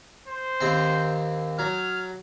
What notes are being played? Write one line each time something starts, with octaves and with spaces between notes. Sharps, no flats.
C5
D#2 C4
F#3 F6